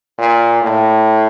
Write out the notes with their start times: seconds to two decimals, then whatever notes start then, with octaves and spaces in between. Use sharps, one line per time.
0.19 A#2
0.62 A2